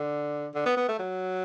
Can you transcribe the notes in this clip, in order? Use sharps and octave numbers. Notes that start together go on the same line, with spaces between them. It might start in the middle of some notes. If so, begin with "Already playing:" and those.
Already playing: D3
D3
B3
B3
A3
F#3